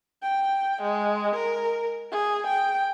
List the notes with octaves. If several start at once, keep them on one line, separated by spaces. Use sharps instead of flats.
G5
G#3
A#4
G#4
G5